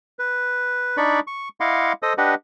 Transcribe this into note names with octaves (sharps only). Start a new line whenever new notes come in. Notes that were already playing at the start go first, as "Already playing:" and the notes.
B4
D4 D#4 D5 B5 C#6
C#6
E4 D#5 F5 F#5 C6 D6
A4 C5 D#5 D#6
D4 G4 B4 D#5 F#5